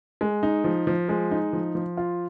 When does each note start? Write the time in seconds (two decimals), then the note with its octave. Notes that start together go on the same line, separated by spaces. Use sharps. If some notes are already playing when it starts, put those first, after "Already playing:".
0.21 G#3
0.43 D#4
0.64 F3
0.87 F3
1.09 G#3
1.31 D#4
1.53 F3
1.75 F3
1.97 F4